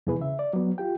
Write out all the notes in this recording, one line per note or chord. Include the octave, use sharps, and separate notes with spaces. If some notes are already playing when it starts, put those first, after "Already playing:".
E2 B2 E3 G#4 B4
C#3 E5
D5
F#3 B3
F4 G4 G5